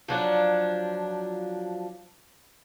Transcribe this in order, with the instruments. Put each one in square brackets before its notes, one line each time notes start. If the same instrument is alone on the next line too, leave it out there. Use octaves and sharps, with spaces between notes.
[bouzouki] F3 F#3 D4